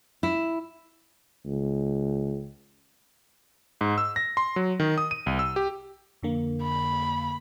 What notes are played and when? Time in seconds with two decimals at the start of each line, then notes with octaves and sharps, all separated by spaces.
0.23 E4
1.45 C#2
3.81 G#2
3.98 E6
4.16 A#6
4.37 C6
4.56 F#3
4.80 D#3
4.98 D#6
5.11 D#7
5.26 C2
5.39 E6
5.56 G4
6.22 F2 D3 A#3
6.63 B5